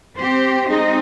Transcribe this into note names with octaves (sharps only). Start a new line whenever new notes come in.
C4 G4 C5
G#3 C4 D#4